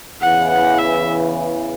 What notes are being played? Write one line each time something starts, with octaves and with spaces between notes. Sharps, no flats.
E2 C#3 E3 F#5
F#5
E5